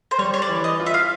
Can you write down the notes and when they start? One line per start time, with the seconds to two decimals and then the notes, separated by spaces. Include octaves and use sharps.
0.11 C5
0.18 G3 C#5
0.34 C#5
0.42 D5
0.49 E3
0.64 D#5
0.80 F4
0.86 E5
0.94 F5